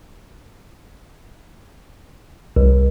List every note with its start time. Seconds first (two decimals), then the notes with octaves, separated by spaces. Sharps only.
2.56 C2